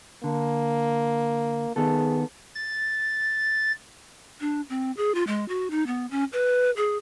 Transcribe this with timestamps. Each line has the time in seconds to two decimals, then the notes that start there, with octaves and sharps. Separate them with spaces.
0.24 D3 A#3
1.76 D#3 B3 G#4 A4
2.55 A6
4.41 D4
4.69 C4
4.97 G#4
5.15 F4
5.27 G#3
5.48 F#4
5.71 D#4
5.87 B3
6.11 C#4
6.33 B4
6.77 G#4